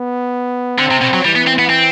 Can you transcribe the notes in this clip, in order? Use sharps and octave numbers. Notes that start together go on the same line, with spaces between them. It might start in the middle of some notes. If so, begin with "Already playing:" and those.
Already playing: B3
D3 C4
C3
B2
F#3
E3 G3
B3
C4
B3
C4